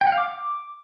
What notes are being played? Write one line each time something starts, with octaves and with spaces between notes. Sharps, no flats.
G5
F#5
F5
D6